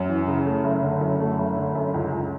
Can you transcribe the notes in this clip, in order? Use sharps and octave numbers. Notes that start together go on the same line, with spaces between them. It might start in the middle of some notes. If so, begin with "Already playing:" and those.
Already playing: F#2
E3
C#3
A3
F#1
D3
F#2
A3
F#1
D3
F#2
C#2
C#2